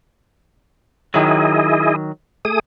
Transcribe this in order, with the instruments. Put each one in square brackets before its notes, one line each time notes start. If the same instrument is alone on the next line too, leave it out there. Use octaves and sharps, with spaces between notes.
[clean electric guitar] D#3 F#3 [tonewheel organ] E4 G#4 D#5
[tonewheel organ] A3 G#4 D#6